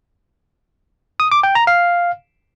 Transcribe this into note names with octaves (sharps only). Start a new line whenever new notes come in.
D#6
D6
G5
A#5
F5